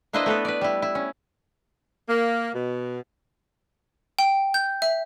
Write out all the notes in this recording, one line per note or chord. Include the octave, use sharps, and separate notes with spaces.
A#3 D4 E4 B4 C5 D#5
A3 B3 A4 B4
B4 D5
G3 E4
E4
C#4
A#3
B2
G5
G6
E5